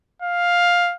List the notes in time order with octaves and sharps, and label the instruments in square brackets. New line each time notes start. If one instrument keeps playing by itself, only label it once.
[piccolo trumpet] F5